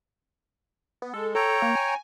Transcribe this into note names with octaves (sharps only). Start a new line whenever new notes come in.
B3
G#3 A4
A4 C#5 G5 A#5
A#3
G#5